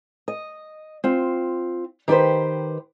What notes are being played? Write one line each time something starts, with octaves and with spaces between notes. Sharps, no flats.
D#5
C4 F4
D#3 G4 G#4 B4 C5